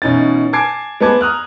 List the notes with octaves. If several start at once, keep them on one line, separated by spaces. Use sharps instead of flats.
B2 E3 C#4 D#4 A6
G#5 A5 D6 G#6 C7 D7
G#3 B3 B4 A5 D6 G#6
A#5 D#6 F6 F#6